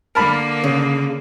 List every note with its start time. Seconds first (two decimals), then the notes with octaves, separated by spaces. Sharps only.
0.15 D3 A#3 A#4 A5 B5
0.64 C#3